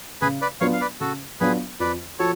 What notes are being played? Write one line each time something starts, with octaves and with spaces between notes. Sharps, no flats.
C#3 G#4 B4
B4 D5
F#3 B3 D4 F4 C#5 F5
F5
B4 D5
C#3 F#4 A4
F#3 B3 D4 F4 G#4 B4
F2 B4 D5
F3 F#4 A4 C#5